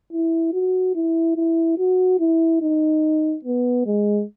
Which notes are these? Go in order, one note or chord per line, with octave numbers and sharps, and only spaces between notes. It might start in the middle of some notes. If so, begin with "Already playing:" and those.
E4
F#4
E4
E4
F#4
E4
D#4
B3
G#3